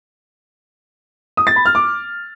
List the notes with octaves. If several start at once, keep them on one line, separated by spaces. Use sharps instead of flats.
D#6
A6
B5
F6
D6